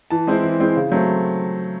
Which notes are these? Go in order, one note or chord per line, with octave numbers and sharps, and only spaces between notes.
E3 A5
G#3 C4 E4
E3
G#3 C4 E4
C#3
F#3 A3 C4